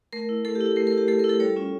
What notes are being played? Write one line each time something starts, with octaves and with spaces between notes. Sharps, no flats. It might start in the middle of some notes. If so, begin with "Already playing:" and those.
A3 A#4
E4
A3 A4
G4
E4
A4
A3 A#4
A#4
E4
G4
A3 A4
E4 A#4
A4
G3 C#5
C#4 F4